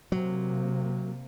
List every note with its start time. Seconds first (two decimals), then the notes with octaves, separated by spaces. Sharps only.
0.12 C3 F#3 A#3